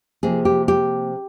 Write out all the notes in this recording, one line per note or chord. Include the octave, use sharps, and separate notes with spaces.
C3 F3 A#3 G#4
G4
G4